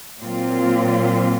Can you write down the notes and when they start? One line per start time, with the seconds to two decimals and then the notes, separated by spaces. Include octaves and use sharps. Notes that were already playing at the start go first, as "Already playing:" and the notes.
0.21 A#2 F#3 C4 F4